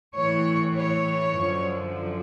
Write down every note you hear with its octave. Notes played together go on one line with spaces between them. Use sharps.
A2 E3 C#5
C#5
F#2 D3 F3